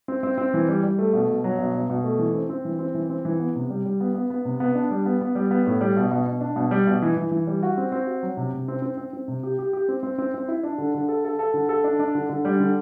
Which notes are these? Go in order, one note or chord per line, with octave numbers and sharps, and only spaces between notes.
C4
C4
C4
E3
G3
G3
A3
B2
B2
F#3
B2
B2
B2
A3
E3
C4
C4
E3
C4
E3
C4
E3
B3
C3
G3
G3
B3
B3
B3
C3
B3
D4
G3
B3
B3
G3
B3
A2
G3
B2
B2
B2
D4
B2
G3
B2
E3
E3
E3
G3
F#4
C4
C4
F#4
F#3
C3
C3
C4
C4
C4
C4
C3
G4
G4
G4
C4
C4
C4
C4
E4
D4
D3
D3
A4
A4
A4
D3
A4
D4
D4
D3
D3
G3
D3